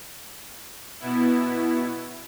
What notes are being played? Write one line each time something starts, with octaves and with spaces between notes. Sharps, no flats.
B2 B3 E4